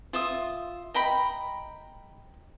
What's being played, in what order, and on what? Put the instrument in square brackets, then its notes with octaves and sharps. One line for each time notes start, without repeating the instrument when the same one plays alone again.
[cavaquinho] F4 E5 D#6
D#5 G5 A#5 B5